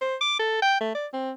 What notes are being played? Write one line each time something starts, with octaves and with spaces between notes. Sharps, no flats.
C5
D6
A4
G5
A3
D5
C4